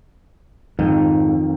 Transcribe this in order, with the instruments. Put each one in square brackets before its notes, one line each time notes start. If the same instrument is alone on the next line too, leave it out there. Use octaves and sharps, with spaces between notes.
[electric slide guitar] F2 [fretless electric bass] G#2 [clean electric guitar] D#3